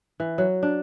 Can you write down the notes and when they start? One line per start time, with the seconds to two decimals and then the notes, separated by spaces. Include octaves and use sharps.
0.20 E3
0.38 F#3
0.63 D4